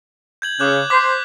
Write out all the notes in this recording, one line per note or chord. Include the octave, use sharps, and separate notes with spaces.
G6 G#6 F#7
C#3 D6 F#6 G6
C5 D6 B6